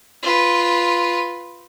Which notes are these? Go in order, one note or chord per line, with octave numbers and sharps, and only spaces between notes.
F4 B4